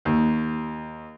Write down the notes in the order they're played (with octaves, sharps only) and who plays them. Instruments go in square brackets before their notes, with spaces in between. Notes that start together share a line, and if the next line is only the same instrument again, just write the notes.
[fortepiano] D#2